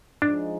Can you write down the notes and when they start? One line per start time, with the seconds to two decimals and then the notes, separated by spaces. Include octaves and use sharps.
0.22 F3 G#3 D4 D#4